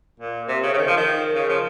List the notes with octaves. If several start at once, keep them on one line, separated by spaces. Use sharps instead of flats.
A#2
C3
C#3
C#3
D#3
F3
D#3
C#3
F3